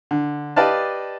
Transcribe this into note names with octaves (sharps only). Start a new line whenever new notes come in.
D3
G4 B4 D5 D#5 F5 A5